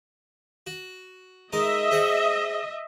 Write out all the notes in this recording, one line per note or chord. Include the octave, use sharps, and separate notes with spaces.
F#4
G#3 D#4 A#4 D#5 E5
G#4 C5 F#5